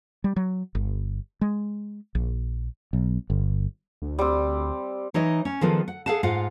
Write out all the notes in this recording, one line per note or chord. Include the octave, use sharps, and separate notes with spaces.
G3
F#3
G1
G#3
A#1
B1
G1
D2
G3 C4
E3 D#4 C#5 D#5
C#4
D#3 F3 G#3 B3 F4 A4
F#5
G#4 A4 F5 F#5 A5
G#2 F4 F5 F#5